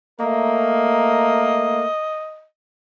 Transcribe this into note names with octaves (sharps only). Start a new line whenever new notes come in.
A3 A#3 A#4 D#5